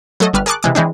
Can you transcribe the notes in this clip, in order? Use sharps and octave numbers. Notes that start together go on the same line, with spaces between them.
F#3 A3 A4 D#5
G1 G3 B4 F6
G#4 A#4 A5 C#6 D6 F#6
C3 E3 G#3 D6
E3 G#3 C4 D4